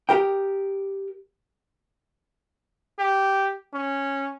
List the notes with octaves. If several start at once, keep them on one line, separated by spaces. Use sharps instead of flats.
G4 A#4 G5
G4
C#4